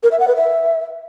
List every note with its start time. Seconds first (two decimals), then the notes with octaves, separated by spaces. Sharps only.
0.03 A#4
0.11 E5
0.20 F#5
0.28 B4
0.36 E5